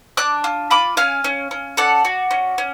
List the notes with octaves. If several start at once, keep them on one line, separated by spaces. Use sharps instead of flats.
D4 D6 F#6
F4
F4 B5 D6
C#4 F5 G#5
C#4
C#4
A4 D5 F#5
F#4
C#4
C#4